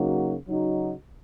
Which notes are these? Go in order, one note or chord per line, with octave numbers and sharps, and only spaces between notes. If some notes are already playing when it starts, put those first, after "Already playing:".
Already playing: C#3 F#3 A#3 D#4 F#4
C#3 F#3 D#4 F#4